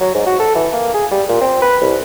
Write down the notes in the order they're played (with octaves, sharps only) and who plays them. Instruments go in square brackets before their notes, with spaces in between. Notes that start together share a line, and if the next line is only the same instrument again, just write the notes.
[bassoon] F#3
G#2
F#4
A4
E3
A#3
G#4
G3
A#2
C4
B4
C2